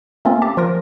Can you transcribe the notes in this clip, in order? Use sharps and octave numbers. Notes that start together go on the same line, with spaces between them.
A3 A#3 C4 C#4 F4
G4 A5
F3 F4 A#4 A#6